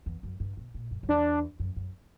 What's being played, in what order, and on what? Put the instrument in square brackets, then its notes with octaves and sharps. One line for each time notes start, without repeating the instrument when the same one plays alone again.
[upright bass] E2
F#2
G2
B2
A#2
F#2
F#2
[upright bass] E2 [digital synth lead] D4
[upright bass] F#2
F#2